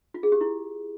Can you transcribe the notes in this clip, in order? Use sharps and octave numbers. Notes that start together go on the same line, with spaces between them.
F4
G#4
G4
E4